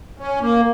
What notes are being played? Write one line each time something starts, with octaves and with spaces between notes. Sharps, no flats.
C#4
A#3